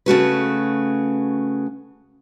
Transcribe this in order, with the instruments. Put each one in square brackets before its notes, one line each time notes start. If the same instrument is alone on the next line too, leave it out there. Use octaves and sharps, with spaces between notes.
[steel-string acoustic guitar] C#3 A3 F#4 B4